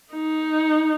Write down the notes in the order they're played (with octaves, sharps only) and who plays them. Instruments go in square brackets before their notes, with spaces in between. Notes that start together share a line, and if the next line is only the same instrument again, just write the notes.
[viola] D#4